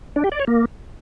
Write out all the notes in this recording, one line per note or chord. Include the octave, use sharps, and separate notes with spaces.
D4
G4
D5
C#5
A#3